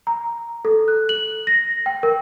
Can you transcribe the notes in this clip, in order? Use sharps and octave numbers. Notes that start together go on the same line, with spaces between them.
A#5
A4
F#6
F#7
A#6
G5
A#4